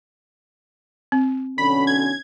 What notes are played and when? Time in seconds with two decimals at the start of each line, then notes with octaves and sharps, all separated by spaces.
1.12 C4
1.58 B1 D3 C#4 B5
1.87 G#6